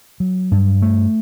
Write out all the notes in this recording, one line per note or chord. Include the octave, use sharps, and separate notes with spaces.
F#3
G2
A3